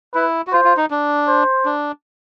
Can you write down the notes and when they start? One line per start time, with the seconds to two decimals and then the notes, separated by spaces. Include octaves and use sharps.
0.14 E4 B4
0.47 F#4
0.52 F4 C5
0.65 F4
0.77 D#4
0.91 D4
1.28 C5
1.65 D4